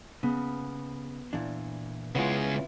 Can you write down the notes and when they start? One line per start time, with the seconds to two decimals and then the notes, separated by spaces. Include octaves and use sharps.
0.23 C#3 B3
1.33 A#2 E3 D4
2.15 C#3 G#3 B3 E4 F4